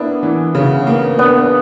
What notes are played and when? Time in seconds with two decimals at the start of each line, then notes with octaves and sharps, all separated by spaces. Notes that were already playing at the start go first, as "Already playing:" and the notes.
Already playing: A#3 B3 D4 E4
0.23 E3
0.55 C#3
0.87 A#3
1.18 B3 D4